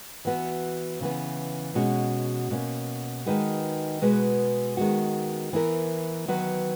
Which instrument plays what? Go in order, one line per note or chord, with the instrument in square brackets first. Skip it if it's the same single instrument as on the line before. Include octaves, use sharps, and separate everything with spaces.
[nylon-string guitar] E3 B3 F#4
C#3 E3 B3
B2 G#3 C#4 F#4
B2 A#3 C#4
D#3 G#3 D#4 F#4 B4
B2 G#3 B3 F#4 B4
D#3 G#3 B3 F#4
E3 B3 E4 A#4
D#3 F#3 B3 F#4 B4